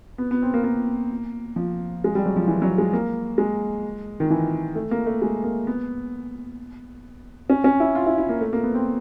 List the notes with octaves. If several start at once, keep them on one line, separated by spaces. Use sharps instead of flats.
B3
B3
C4
A#3
A#3
F3
G#3
G3
F#3
F3
E3
F#3
G#3
A#3
G#3
D#3
E3
A3
A#3
A3
G#3
A#3
B3
C#4
C#4
E4
F4
E4
E4
A#3
A3
A#3
B3
C4